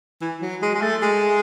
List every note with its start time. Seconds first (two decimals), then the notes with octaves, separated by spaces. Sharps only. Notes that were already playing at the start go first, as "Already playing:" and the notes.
0.21 E3
0.42 F#3
0.62 G#3
0.75 G#3
0.82 A3
1.02 G#3